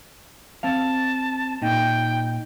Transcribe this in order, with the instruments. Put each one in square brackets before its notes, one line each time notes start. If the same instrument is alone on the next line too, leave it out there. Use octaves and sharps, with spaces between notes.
[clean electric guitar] C4 F5 [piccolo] A5
[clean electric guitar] A#2 D#4 [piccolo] G5